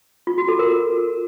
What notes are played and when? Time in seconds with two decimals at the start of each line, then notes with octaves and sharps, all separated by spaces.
0.27 F4
0.38 F#4
0.48 A4
0.59 A#4